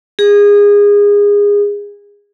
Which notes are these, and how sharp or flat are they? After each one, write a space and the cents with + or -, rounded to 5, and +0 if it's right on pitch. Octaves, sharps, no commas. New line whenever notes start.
G#4 -25